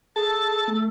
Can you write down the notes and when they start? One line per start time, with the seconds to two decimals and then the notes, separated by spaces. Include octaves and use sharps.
0.16 G#4 A4 A5
0.68 A3